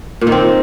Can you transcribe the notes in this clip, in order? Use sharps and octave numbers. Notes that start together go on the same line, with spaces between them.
A#2
D#3
C4